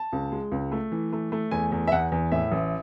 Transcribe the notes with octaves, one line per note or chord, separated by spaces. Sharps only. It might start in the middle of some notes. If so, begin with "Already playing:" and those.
Already playing: A5
C#2
G#3
C#2
A3
E3
A3
A3
E2 G#5
E2
E5
E2 F#5
E2
A2 E5
A1